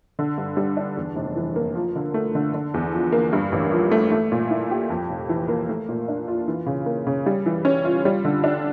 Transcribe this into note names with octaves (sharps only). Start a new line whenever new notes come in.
D3
G2
G3
D4
E2
F1
E3
A#3
F3
D3
A3
D3
D3
E2
F3
A#3
G2
A1
F3
A3
A3
A#2
E4
G4
F2
F1
E3
A#3
A3
A#2
D4
F4
E3
C#3
A#3
C#3
G3
E3
C#4
F4
G3
D3
D4